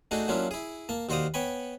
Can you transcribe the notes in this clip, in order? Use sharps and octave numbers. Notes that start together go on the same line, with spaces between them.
A3 D4 D#4 F#4 G#4
F#3 A#3 C#4 D4 E4 F4
E4 G#4
A#3 A5
D#2 F#4 C5 D5 F5 D#6
B3 C#5 G5 G#5 B5